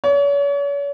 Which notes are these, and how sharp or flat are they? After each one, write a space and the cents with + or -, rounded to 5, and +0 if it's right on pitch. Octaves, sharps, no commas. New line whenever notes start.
C#5 +40